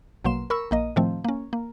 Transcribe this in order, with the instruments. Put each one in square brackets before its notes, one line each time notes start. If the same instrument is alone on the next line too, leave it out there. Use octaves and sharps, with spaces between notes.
[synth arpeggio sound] A#1 B2 F#3 A#3 C6 E7
A#4 B5 C#6 E6
A#1 A#3 D#5
A2 D#3 F3 A3 C4
A#3 C#4
A#3